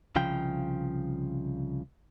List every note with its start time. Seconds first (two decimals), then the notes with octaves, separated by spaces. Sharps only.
0.16 C2 C#3 F3 G5